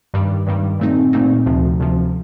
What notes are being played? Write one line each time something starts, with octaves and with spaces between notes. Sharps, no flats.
G2 D#3 G3
G2 D#3 G3
A#2 A3 C4 D#4
A#2 A3 C4 D#4
D2 C3 F3
D2 C3 F3